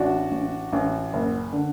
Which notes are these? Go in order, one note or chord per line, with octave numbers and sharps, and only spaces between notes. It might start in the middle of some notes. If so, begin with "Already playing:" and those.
Already playing: A1 D4 F#4
A1
A1
F#1
D3